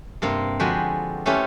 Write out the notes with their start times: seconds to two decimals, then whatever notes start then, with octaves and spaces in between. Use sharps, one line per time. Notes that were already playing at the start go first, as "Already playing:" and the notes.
0.22 G2 C3 A#3 C4
0.59 D3 F3 G#3 F#4 G4 B4
1.26 A3 C#4 E4 F4 G4 B4